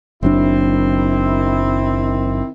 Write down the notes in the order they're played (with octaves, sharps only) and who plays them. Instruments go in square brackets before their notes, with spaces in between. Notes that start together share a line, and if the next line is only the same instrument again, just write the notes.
[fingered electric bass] F#1 F#3 D4 [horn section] D#3 C4 E4